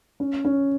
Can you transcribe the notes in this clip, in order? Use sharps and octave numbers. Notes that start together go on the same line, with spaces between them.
C#4
C#4